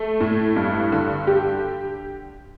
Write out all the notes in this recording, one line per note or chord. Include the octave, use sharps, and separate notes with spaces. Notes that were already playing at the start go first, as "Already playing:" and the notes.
Already playing: A3
A2
G2
D3
G4